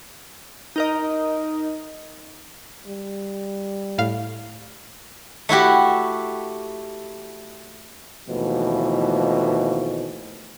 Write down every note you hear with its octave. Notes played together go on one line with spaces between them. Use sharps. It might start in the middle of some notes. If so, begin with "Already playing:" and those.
D#4 A#4 D#5
G3
A2 F5
A3 E4 F#4 G4
D#2 B2 E3 F3 A3